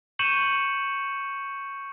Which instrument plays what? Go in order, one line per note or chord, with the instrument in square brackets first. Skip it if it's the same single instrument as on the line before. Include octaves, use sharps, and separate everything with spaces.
[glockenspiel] C#6 G6 C#7 D#7 E7 F#7